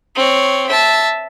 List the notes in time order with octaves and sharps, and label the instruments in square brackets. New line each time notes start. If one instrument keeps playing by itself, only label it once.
[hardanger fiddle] C4 C#5
E5 A5